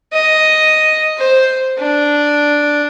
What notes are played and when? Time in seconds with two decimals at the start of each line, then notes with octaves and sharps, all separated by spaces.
0.13 D#5
1.18 C5
1.79 D4